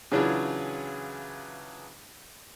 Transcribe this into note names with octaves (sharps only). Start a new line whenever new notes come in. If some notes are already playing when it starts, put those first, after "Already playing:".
C#3 E3 F#3 D4 F4 G#4